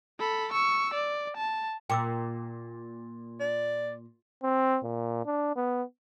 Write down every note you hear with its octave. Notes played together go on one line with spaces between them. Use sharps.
A4 B5
C#6 E6
D5
A5
A#2 G5 D6 E6
D5
C4
A#2
D4
B3